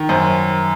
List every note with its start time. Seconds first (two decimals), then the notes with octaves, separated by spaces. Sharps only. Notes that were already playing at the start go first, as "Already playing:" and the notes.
Already playing: D#3
0.09 F#2 C5